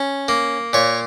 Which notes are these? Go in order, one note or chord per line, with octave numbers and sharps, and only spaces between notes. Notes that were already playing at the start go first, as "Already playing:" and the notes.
Already playing: C#4
A#3
A#2 C#5